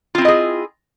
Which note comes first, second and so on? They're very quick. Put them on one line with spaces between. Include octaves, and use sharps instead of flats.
F4 C4 E4 D#5 G#4